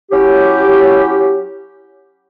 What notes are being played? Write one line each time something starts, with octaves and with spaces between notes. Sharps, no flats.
F#3 C#4 E4 G4